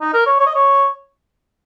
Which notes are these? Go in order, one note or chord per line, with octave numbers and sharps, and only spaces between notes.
D#4
A#4
C#5
C#5
D#5
C#5